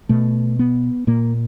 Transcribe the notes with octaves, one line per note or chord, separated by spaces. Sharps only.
B2 A3
B3
A#2 A#3